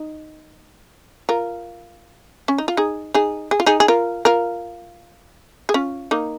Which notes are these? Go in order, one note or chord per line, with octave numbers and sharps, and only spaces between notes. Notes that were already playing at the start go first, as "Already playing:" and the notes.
Already playing: D#4
F4 A#4
C#4
D#4
F4
D#4 G#4
D#4 G#4
G#4
F4
D#4 G#4
G#4
F4 A#4
F4 A#4
G#4
C#4 F4
A#3 D#4